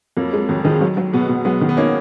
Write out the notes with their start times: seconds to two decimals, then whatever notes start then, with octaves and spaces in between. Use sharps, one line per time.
0.17 F2 F#3 A#3
0.33 G#3
0.48 F2 D#3 F#3
0.60 F#3
0.65 D#3 F3 G#3
0.81 F#3
0.97 F#3
1.13 B2 G#3 B3
1.29 B2
1.45 F#3 G#3 B3
1.61 D#3
1.69 B3
1.77 A#3 C#4 D#4